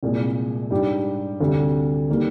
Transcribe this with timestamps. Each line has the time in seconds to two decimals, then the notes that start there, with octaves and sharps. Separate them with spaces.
0.03 C2 A#2 G#3
0.71 G#2 G3 D4 G4
1.41 D2 C3 G3
2.10 D#3 G3 A#3